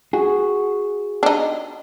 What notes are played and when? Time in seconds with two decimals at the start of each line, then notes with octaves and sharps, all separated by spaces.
0.13 F#4 G#4
1.23 D4 D#4